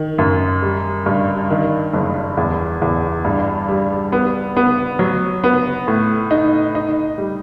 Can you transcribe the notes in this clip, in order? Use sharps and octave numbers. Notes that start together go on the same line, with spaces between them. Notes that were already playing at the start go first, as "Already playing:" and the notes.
Already playing: D#3
F#2
G3
G2
D#3
F#1
E2
E2
G2
G3
B3
B3
F#3
B3
A2
D#4
D#4
G3